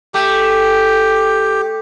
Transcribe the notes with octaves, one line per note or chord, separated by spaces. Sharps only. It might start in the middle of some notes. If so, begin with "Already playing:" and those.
A3 G4